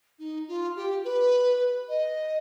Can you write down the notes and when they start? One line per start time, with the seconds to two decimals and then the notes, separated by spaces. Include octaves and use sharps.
0.19 D#4
0.48 F4
0.76 G4
1.05 B4
1.89 D#5